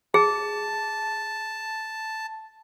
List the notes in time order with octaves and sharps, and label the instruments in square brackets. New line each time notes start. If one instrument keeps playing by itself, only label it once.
[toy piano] G#4 [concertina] A5